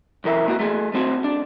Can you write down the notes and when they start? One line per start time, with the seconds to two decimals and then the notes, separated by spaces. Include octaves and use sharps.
0.24 B1 E3 A#4 E5
0.46 A#2 A#3 F#4
0.60 A3 G#4
0.94 A3 C4 F#4
1.24 D4